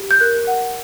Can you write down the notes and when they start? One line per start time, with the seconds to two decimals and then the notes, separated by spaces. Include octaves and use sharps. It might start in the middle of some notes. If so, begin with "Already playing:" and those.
Already playing: G4
0.11 G6
0.21 A#4 F#6
0.47 F#5